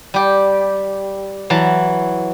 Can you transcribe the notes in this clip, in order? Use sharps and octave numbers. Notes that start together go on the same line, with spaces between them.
G3 G4
E3 F#3 A5